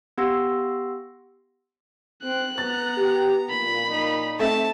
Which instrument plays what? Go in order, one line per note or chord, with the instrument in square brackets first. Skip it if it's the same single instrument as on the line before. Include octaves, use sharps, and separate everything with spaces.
[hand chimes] B3 G4 F#5 C6 E6 A#6
[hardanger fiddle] C4 [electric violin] F#6
[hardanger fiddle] B3 A#5 [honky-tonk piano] A6
[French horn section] G4
[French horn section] A#2 [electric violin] B5
[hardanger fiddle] D#4
[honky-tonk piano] A3 C4 E5 [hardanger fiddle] A5